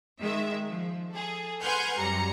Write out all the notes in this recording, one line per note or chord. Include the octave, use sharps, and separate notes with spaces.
D#3 G#3 E5
F3
G#4 A4
B4 F#5 G#5 C6 F6 G6
F#2 G3 A#5 C#7